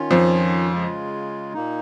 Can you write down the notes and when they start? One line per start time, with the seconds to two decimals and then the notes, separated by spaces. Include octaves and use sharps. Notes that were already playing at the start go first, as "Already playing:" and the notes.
Already playing: D#3 C#4 F4
0.11 F2 F3
0.72 C#3 G#3 F4
1.54 A#2 A#3 D#4